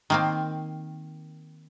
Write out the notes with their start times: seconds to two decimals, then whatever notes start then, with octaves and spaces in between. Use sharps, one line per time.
0.10 D#3 A#3 C4